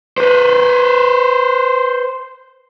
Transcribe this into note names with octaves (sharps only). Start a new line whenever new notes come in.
B4 C5